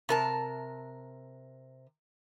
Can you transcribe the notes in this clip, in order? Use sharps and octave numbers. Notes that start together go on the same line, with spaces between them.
C3 A#4 A5